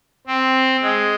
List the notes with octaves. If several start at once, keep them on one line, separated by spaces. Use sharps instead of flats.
C4
G#3